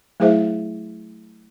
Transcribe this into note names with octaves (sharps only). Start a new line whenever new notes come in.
F#3 A3 E4 G#4 C5 E5